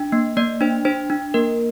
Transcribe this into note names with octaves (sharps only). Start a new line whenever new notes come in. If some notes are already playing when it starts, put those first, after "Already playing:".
Already playing: D4
A#3
A#3 D5
D4 C5
D4 C5
D4
A#3 A#4